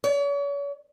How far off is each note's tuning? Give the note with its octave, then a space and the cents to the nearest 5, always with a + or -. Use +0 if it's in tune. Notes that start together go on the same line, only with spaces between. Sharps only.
C#5 +40